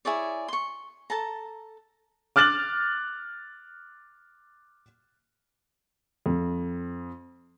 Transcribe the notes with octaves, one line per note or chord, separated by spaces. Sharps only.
E4 G#4 C#5 D5
C6 C#6
A4 A5 A#5
D6 F6 F#6 A6 F#7
F2